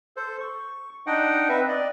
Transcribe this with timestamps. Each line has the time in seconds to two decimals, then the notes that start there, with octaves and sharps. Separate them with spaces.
0.17 A4 C5
0.40 C#6
1.07 D4 D#4 D#5 F#5 G5
1.49 C4 B4 E5
1.68 D5 D#5